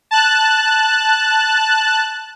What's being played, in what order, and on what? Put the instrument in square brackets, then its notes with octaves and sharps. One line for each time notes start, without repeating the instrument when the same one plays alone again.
[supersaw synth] A5 F#6